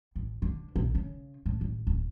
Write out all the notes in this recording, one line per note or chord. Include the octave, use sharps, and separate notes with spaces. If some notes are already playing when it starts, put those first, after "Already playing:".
A1
D3
A#1
C#3
A2
A1
D1